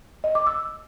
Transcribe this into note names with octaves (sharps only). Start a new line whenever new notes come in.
D#5
D6
E6